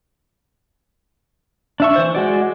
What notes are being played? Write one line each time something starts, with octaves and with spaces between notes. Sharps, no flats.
D4 E5 C#6
E3 C5
G#3 F#4 D5